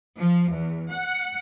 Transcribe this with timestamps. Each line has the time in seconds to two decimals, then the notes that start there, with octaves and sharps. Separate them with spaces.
0.18 F3
0.52 E2
0.91 F#5